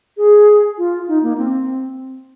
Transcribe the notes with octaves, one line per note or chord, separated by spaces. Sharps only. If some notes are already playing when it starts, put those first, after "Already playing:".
G#4
F4
D#4
A#3
C4